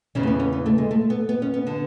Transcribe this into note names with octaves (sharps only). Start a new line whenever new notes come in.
E2 C#3 E3 C#4
A3
B3
C#4
B3
A3
G#3
A3
B3
B3
C#4
B3
D3